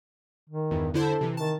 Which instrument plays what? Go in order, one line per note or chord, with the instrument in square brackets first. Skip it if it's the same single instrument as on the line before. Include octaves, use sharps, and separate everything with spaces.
[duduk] D#3
[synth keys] E2 G2
[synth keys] D3 E4 C5 [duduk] A4
[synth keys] C3 E3
[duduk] D#3 [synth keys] A5